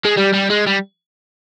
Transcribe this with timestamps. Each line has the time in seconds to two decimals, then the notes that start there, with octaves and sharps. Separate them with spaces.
0.05 G#3
0.17 G3
0.33 G3
0.50 G#3
0.67 G3